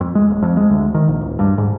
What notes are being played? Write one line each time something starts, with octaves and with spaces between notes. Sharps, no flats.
F2
G#3
D#1
F2
G#3
D2
D#3
A#1
D1
G2
G#2